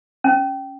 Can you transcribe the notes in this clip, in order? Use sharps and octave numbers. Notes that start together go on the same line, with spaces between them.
C#4